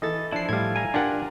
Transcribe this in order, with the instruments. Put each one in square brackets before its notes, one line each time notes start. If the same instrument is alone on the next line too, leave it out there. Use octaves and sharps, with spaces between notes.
[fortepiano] E3 A4 [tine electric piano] D#5 A6
[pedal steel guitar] F3 E4 [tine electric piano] D4 C7
[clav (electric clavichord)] A2 G3 [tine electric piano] F5 G#6
[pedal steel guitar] G#5 A#5
[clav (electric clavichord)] D4 F#5 [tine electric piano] F4 [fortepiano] G4 A#4